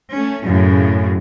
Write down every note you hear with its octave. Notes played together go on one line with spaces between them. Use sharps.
A3 C#4
F#2 A2 C#3